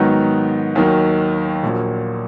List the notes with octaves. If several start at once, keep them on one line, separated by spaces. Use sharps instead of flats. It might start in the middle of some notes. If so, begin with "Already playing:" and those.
Already playing: G#2 D#3 F#3 B3 D#4
D#2 D#3 F#3
A#1 A#2 F#3